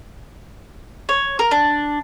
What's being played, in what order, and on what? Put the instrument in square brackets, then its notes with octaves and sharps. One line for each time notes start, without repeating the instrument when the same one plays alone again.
[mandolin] C#5
A#4
D4